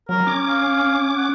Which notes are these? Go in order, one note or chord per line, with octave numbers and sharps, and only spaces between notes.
F#3 A#4
C#4 D6
F5
F#5